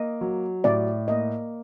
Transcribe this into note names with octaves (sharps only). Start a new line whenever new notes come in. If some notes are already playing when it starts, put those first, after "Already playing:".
Already playing: A#3 D#5
F#3
A2 D5
A#3 D#5